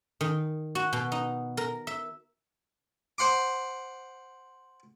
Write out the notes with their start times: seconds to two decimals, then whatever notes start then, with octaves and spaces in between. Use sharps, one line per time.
0.21 D#3
0.75 F#4
0.93 B2
1.12 D#4
1.57 A#4
1.87 E5
3.18 C5 F#5 C6 D6